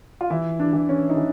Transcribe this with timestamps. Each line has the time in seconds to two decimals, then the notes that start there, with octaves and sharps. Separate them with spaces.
0.21 F4
0.30 E3 E4
0.59 D4
0.73 E3
0.89 C#4
1.10 D#4
1.17 E3